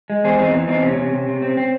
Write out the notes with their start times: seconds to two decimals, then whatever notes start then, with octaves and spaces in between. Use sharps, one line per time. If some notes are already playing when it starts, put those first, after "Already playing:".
0.10 G#3
0.24 E2 G#4 C5
0.39 E2 C4 D#4
0.54 E3
0.68 E2 C4 D#4
0.83 C3 C#4
0.97 C3
1.13 C3
1.28 C3
1.42 C4
1.57 C4